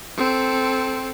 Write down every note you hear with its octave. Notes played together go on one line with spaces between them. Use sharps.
C4 A4